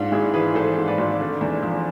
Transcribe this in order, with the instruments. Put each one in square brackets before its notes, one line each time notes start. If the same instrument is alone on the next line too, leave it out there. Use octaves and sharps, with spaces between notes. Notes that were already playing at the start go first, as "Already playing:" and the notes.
Already playing: [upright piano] G#2 D4 F4
G#1 E4 G#4
E3 G#4 B4
G#1 A4 C5
G#2
B4 D5
G#1
D3
E2
F3